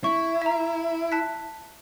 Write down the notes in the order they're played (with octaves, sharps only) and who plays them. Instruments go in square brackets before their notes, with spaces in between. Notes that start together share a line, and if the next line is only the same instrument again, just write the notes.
[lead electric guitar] E4 [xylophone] C#6
[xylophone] E5 A#5
A5 F#6 B6